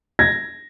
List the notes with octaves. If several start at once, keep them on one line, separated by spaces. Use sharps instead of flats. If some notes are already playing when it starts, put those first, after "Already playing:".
G#6 A#6